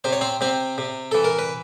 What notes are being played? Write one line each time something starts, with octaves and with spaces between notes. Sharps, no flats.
C3 C5
C#5
C4 C5
C3 C4 C5
C3
E3 A4
A#4
B4